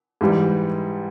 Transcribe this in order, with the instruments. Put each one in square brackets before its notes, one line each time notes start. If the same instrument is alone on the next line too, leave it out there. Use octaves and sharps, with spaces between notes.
[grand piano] G#2 E3 G3